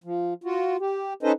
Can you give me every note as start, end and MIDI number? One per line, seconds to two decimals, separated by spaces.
0.04 0.34 53
0.44 0.77 65
0.44 0.77 66
0.80 1.13 67
1.23 1.32 61
1.23 1.32 63
1.23 1.32 69
1.23 1.32 71
1.23 1.32 72
1.23 1.32 75